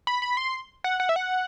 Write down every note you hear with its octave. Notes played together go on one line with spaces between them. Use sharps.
B5
B5
C6
F#5
F#5
E5
F#5